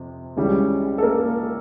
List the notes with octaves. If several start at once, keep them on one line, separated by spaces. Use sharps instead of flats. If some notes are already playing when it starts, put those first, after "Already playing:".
Already playing: F2 C3
C#2 C#3 E3 G3
A4
A#3 A#4